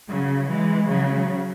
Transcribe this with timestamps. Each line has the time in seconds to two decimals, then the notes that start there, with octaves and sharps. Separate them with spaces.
0.10 C#3 F#3
0.48 E3 G#3
0.88 C#3 F#3